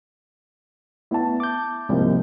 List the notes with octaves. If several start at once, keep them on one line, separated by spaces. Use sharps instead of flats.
A3 B3 E4 A5
D6 G6
C2 G#2 C3 F3 A#3